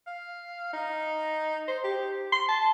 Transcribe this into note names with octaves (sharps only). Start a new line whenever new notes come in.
F5
D#4
C5
G4
C6
A5